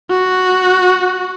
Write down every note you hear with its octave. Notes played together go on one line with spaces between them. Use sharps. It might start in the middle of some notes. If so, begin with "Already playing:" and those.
F#4